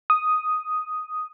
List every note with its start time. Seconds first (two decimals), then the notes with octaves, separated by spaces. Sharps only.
0.10 D#6